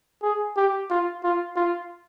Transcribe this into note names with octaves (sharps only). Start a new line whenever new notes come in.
G#4
G4
F4
F4
F4